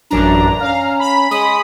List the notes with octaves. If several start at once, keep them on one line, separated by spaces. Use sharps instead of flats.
A1 F#2 D4 A#5
C#4 F5
B5
G#3 D#6